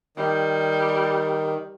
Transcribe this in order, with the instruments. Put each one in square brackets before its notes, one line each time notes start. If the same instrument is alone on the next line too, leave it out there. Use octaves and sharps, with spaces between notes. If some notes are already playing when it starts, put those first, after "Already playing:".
[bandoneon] D#3 [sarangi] G3